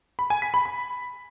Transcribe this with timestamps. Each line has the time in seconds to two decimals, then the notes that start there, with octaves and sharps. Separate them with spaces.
0.19 B5
0.30 G#5
0.42 B6
0.54 B5
0.65 B5